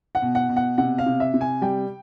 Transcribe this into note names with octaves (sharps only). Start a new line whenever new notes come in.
F#5
B2
F#5
B2
F#5
C3 F#5
F5
C3
E5
C3
G#5
G3 G5